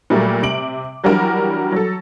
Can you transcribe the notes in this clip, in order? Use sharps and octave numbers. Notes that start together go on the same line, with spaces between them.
A#2 F#3 G3 A3 A#3
C3 D6 D7 F#7
E3 F#3 G3 D4 F#4 A#4
F#3 A4